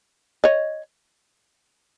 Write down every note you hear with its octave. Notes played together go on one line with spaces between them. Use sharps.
C#5 D#5